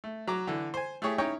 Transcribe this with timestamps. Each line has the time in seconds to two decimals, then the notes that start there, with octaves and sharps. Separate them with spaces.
0.04 A3
0.27 F#3 A#5 D6
0.47 D3 E3
0.74 C5 G#5
1.02 A3 E4 G4 G#4 C#5
1.18 C#4 D#4 E4 C#5 G5 A#5